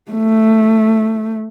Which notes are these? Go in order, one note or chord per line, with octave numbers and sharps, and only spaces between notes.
A3